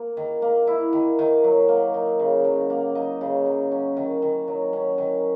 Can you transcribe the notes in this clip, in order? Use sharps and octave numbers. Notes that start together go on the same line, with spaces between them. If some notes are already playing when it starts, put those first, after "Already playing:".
Already playing: A#3
D#3
A#3
E4
D#3
D#3
F#3
A#3
D#4
C#3
F#3
A#3
D#4
C#3
F#3
C#4
D#3
D#3
F#3
C#4
D#3